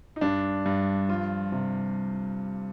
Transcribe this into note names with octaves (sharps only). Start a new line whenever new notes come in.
D#4
G2 D4
G2
F3 F4
C3